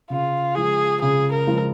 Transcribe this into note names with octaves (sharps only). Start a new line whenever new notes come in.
C#3 F4
F3 G#3 F4 G#4
C#3 G#4
A#4
F3 G#3 F4